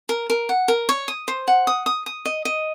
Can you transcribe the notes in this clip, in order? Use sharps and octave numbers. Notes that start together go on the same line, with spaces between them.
A#4
A#4
F#5
A#4
C#5
D#6
C5
F#5
D#6
D#6
D#6
D#5
D#5